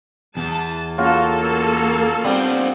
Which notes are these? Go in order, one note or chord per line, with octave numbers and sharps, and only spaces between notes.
E2 A5
C#3 A#3 F4 F#4 A4
G3 B3 C4 D4